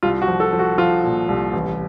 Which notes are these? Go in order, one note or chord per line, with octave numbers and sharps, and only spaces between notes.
C2 F4
F#4
F3
A4
F3
F#4
F3 F4
A#2
C2
A1